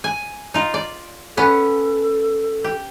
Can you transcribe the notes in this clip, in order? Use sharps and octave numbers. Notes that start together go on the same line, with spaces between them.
G#5
D#4 F4
D5
B3 C#4 A4
G4